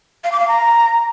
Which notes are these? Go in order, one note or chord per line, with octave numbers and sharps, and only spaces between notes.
F5
D6
F5
A#5